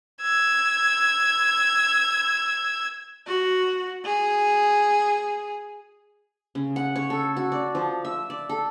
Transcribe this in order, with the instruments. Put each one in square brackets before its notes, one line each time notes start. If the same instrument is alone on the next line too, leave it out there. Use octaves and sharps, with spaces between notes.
[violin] E6 G#6
[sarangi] F#4
G#4
[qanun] C#3
F#5
C#5
A4
F#4
D5
F3
E5
D5
A4